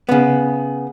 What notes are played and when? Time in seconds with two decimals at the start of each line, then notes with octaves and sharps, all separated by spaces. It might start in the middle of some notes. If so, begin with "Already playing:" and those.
0.09 C#3 B3